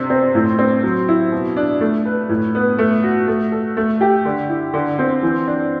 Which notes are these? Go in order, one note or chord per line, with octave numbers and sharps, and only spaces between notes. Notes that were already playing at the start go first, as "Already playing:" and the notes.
Already playing: C3 D4
C4
A2
C4
F#3
E4
B2
D4
A3
B4
A2
B3
A3
F#4
A3
A4
A3
G4
D3
E4
D3
C4
E3
D4